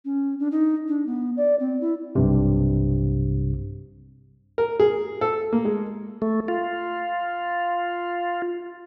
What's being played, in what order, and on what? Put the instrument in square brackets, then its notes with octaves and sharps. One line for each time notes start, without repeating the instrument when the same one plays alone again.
[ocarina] C#4
D4
D#4
D4
B3
D5
C4
E4
[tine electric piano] B1 G2 C3
[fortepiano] A#4
G#4
A4
A#3
G#3
[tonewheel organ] A3
F4